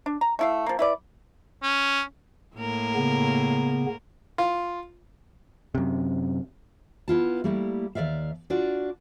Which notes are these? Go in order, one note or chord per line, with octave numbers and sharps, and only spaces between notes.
D4
A#5
A3 E4 F5
F3 A#3
E4 B4 D5
C#4
A2 A#3 A#4
C#3 B3
F4
F#2 C3
B3 E4 F4 A5
G3 A3 A#3 E4 G4
D#2 F#3 D5 E5 F5
D4 F4 F#4 D5